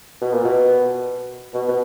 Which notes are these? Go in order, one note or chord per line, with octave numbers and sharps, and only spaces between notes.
B2
A#2
B2
B2
B2